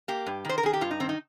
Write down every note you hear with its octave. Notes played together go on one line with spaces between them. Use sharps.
A#3 G4
G2
D#3 C5
A#4
D#3 G#4
G4
G2 F4
D#4
D#3 C4
D#4